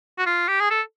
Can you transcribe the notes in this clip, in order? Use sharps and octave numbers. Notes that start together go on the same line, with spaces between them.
F#4
F4
G4
G#4
A4